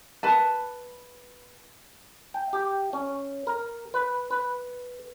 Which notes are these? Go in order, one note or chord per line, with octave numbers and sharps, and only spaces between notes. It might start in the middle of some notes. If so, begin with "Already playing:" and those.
B4 A5
G5
G4
C#4
A#4
B4
B4